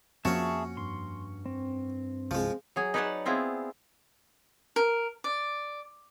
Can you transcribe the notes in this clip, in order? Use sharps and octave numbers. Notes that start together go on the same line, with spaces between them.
F2 F3 A#3 C#4 F#4 G#4 E5 A5
G2 C6
C4
C2 F3 G#3
F#3 G#4
D#4 B4 C#5 D5 F#5 A5
B3 C4 E4 F4 G#4
A#4
D5